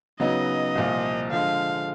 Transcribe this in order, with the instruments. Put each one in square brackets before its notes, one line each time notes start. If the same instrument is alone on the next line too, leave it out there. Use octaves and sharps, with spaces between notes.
[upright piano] C#3 F#3 B3 D#4 [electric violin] D#5
[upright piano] C2 A#2 F3
[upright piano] D3 F3 G#3 [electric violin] F5